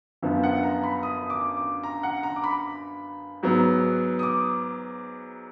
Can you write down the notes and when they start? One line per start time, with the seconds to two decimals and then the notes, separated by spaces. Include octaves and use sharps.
0.22 F#2 D3 F3 B3
0.43 F#5
0.63 A#5
0.84 B5
1.03 D#6
1.30 D6
1.57 D6
1.84 A#5
2.03 F#5
2.23 A#5
2.36 D6
2.44 B5
3.43 G#2 F#3 B3
4.19 D#6
4.23 D6